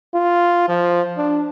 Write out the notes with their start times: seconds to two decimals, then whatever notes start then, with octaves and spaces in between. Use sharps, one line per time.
0.15 F4
0.68 F3
1.17 D4